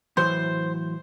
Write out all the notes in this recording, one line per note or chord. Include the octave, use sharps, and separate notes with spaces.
A2 E3 F#3 C5